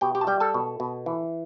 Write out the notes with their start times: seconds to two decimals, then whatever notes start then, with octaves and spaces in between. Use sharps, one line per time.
0.01 B2 G4 G5
0.15 G4 G5
0.21 A5
0.27 G3 G4 G5
0.40 A4 A5
0.54 B2
0.80 B2
1.06 E3